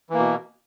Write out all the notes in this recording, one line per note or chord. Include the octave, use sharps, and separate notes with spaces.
B2 E3 A#3